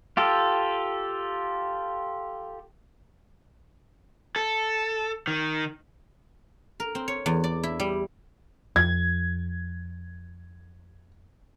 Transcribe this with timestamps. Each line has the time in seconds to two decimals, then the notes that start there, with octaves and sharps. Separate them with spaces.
0.17 F4 G4 A4
4.36 A4
5.27 D#3
6.80 A#4
6.95 C4
7.08 C#5
7.26 E2
7.44 D5
7.63 E4
7.80 G3
8.76 F2 G#6